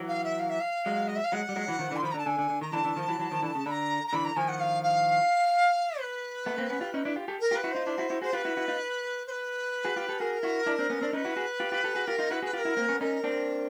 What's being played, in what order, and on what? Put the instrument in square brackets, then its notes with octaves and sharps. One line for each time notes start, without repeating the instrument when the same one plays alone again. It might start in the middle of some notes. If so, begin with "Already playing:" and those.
Already playing: [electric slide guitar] E3 F#3
[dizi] F5
E5
F5
E5
F5
[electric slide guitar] F#3 G#3
[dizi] D#5
E5
F5
[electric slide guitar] F#3 G#3 [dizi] F#5
[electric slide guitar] G3
F#3 G#3
E3 F#3
D#3 F3
D3 E3
[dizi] C6
[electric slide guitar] D#3 F3 [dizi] B5
[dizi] A#5
[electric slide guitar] D3
[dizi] A5
[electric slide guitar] D3 [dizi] G#5
[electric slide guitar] D3
D3
[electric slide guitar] D#3 [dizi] A#5
[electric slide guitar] D3 E3 [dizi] A5
[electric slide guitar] D3 E3
D#3 F3
E3 F#3
E3 F#3
D#3 F3
D3 E3
C#3
[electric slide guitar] D3 [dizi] B5
[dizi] A#5
A#5
[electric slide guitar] D3 E3 [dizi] B5
[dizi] A#5
[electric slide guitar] D#3 F3 [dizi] G#5
[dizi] F#5
F5
F5
B4
[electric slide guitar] A3 B3
A#3 C4
B3 C#4
F4 G4
C#4 D#4
D4 E4
F4 G4
G4 A4
[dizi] A#4
[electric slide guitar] F4 G4
[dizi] B4
[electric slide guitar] E4 F#4
[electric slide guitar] D#4 F4 [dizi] C5
[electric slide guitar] D4 E4
E4 F#4
E4 F#4
[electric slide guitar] F#4 G#4 [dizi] C5
[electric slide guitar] F4 G4 [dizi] B4
[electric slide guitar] E4 F#4
E4 F#4
D#4 F4
[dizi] C5
B4
[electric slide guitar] F#4 G#4
F4 G4
G4 A4
[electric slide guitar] F#4 G#4 [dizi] A#4
[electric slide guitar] E4 F#4
D4 E4
C4 D4
B3 C#4
C4 D4
[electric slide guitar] C#4 D#4 [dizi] B4
[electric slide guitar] E4 F#4
F#4 G#4
F4 G4
F4 G4
G4 A4
F#4 G#4
[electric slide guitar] F4 G4 [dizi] A#4
[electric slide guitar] D#4 F4
[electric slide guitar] E4 F#4 [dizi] B4
[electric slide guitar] F#4 G#4 [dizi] B4
[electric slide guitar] F4 G4 [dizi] B4
[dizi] A#4
[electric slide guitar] E4 F#4
A#3 C4
B3 C#4
[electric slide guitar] C#4 D#4 [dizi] A#4
[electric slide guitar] C4 D4